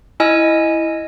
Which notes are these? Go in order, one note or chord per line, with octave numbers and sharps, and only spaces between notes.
E4 D#5 G#5 E6